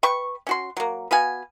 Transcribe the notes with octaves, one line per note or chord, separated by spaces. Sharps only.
B4 G5 C#6
C#4 F#4 C6
F#3 A#3
B3 F#4 F5 G#5